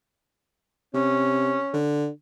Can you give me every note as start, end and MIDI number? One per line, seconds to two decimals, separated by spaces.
0.94 1.58 48
0.94 1.80 61
1.74 2.09 50